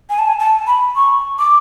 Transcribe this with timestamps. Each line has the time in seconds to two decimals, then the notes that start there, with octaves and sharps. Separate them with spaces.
0.10 G#5
0.19 A5
0.27 G#5
0.40 A5
0.67 B5
0.96 C#6
1.39 D6